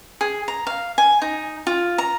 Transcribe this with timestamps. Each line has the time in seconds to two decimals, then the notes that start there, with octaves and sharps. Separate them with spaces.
0.21 G#4
0.48 A#5
0.67 F5
0.98 G#5
1.22 D#4
1.67 F4
1.98 A#5